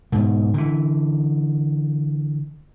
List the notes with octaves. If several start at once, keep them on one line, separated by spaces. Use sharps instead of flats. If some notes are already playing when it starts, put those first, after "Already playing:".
G#2 B2
D3 E3